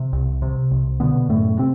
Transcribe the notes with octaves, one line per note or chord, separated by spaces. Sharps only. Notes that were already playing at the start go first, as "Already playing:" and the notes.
Already playing: C3
C2
C3
C2
B2 D3 B3
F#2 A2 A3
C3 C4